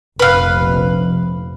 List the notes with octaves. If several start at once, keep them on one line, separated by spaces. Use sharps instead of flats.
F1 A#1 F2 B4 F5